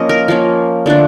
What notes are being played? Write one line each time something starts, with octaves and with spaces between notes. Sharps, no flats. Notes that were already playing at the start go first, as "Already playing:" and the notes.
Already playing: F3 A#3 C#4 D#5
A#4
F3 A#3 C#4
D3 F3 A3 D4